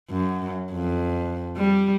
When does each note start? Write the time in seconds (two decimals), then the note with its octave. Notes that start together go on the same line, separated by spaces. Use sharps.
0.10 F#2
0.72 F2
1.57 G3